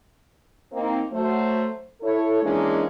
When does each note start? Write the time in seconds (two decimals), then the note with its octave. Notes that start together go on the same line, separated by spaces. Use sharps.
0.72 A#3 C4 D#4
1.12 F#3 A3 C5
2.01 E4 A4 C#5
2.41 D#3 E3 G#3 A#3 C#4 D4